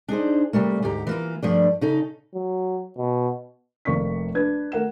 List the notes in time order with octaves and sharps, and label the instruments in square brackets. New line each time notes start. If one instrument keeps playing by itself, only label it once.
[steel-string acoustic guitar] D4 D#4 G#4 C5
C3 G3 A3 A#3
D2 G#2 G4 A#5
E3 A#3 F4
G2 F3 A3 D4
C#3 D#4 A4
[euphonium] F#3
B2
[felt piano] F1 C3 A#3 D5 C#6 B6
D4 B4 G#6
A3 A#4 F#5 E7